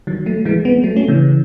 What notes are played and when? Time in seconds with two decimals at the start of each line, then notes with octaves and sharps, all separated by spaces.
0.07 D#3 F#3
0.26 F#3 A3
0.45 E3 G#3
0.65 G#3 B3
0.84 F#3 A3
0.96 A3 C#4
1.08 C#3 E3